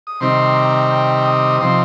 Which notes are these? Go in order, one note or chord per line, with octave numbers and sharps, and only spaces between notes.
D#6
C3 D#3 G3 C4 D#4 C6
A#5
G5
D#6
C3 F3 C4 D#4 C6